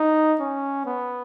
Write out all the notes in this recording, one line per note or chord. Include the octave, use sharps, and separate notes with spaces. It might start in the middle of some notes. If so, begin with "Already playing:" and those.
Already playing: D#4
C#4
B3